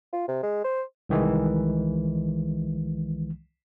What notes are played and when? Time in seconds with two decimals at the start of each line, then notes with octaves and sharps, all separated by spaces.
0.13 F4
0.28 C3
0.43 G#3
0.64 C5
1.09 C2 D#3 E3 G#3